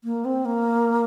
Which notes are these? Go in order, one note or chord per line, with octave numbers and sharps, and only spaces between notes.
A#3
C4
A#3